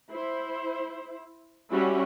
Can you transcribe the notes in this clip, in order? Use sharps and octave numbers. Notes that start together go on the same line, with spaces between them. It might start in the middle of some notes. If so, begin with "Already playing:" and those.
E4 C5
G3 C#4 E4 F#4